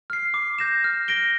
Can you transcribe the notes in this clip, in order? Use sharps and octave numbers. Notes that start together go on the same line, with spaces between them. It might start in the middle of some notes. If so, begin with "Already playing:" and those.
F6 C7
D6
G6 A#6 E7
F6
A#6 D7 G7